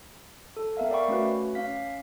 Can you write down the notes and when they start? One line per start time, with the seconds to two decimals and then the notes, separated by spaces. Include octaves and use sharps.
0.57 A4
0.77 B3 A#4 E5 F5
0.91 D5 E5 F5 G5 B5 C#6
1.08 A3 C#4 F#4 B4
1.55 C#4 F5 B6